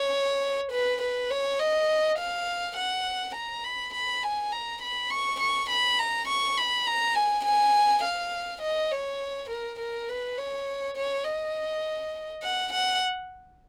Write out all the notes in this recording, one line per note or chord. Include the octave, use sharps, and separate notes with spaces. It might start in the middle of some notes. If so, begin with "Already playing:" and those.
Already playing: C#5
B4
B4
C#5
D#5
F5
F#5
A#5
B5
B5
G#5
A#5
B5
C#6
C#6
B5
A#5
C#6
B5
A#5
G#5
G#5
F5
D#5
C#5
A#4
A#4
B4
C#5
C#5
D#5
F#5
F#5